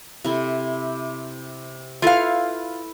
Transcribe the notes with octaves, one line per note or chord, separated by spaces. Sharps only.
C3 E4 A4
E4 F4 A4 B4 F5